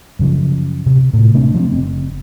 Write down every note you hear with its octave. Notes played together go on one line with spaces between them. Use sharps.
F#2 C#3 F3
C3
A2
C3 A3 C4 D4
F3 A3 A#3 C4
F#1 C4